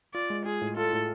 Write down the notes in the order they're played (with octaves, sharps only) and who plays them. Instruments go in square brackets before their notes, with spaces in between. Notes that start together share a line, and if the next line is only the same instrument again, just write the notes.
[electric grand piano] F4 [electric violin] D5
[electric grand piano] G#3
[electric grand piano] F4 [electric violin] G#4
[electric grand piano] A2
[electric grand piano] F4 [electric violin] A4
[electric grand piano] A2